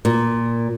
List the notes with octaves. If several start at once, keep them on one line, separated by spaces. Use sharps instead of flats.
A#2